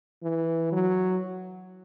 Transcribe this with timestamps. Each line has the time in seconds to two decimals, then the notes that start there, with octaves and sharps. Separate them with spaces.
0.23 E3
0.73 F#3